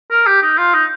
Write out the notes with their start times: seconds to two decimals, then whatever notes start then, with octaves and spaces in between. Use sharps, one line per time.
0.11 A#4
0.27 G4
0.42 D#4
0.58 F4
0.74 D#4